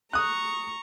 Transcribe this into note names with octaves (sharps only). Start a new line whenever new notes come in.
A#5 C#6 D#6 F#6